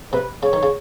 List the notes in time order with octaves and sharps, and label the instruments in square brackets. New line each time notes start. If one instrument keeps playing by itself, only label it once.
[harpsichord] C3 [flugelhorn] B4
[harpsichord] C#3 [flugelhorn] C#5
[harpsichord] D#3
C#3